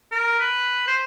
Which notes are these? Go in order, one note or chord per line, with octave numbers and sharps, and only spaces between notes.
A#4
B4
C5